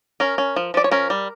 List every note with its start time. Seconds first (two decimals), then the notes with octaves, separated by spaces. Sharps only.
0.20 C#4 A#4
0.38 C#4
0.56 F3
0.74 F3 D5
0.84 C#5
0.91 C#4 A#4
1.10 G3